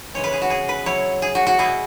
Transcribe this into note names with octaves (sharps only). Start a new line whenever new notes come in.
C#3 E3 G#3 C#4 C#5
B4
G#4
F#4
G#4
B4
F#3 E4 C#5
G#4
F#4
F#4
B2 B3 E4 G#4